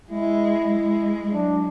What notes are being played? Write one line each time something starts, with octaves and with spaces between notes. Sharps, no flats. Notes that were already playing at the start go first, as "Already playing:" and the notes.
G#3 E4
G#3
F#3 D4